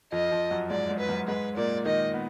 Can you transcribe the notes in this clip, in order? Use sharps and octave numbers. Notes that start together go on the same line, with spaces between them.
F2 F3 D#5
F2 F3
F#2 F#3
G#2 G#3 D5
G#2 G#3
B4
F#2 F#3
G#2 G#3 B4
A#2 A#3 D5
D#3 D#4 D#5
B3